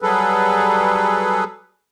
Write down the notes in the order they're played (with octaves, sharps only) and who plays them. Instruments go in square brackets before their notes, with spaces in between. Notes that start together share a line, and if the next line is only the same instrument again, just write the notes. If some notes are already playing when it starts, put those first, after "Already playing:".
[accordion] F#3 G3 G#4 A4 B4